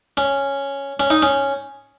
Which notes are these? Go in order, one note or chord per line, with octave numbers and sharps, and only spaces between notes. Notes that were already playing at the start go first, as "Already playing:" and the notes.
C#4
C#4
D#4
C#4